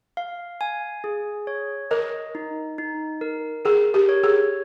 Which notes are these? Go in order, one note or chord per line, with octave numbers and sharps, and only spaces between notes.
F5
G#5
G#4
C#5
A#4 D#5
D#4
D#4
A#4
G#4 A#4
G4
C#5
G#4